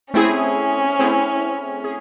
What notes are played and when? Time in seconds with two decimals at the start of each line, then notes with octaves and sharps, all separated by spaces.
0.14 A3 C4 C#4 E4 G#4
0.99 A3 C4 E4 G#4
1.84 G#4